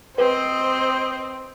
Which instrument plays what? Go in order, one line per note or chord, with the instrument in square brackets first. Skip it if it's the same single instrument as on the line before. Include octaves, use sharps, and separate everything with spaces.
[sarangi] C4 [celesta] B4 [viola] C5 D#5